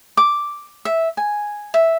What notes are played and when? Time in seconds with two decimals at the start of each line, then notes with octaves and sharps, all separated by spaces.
0.17 D6
0.85 E5
1.17 G#5
1.74 E5